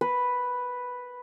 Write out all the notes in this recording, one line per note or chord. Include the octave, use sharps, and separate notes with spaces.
B4